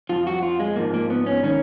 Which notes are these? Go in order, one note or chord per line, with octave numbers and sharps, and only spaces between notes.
F2 F3 F4
F#4
F4
G#3
G#2 F3 A#3
A#3
B3
C#4
D#3 C#4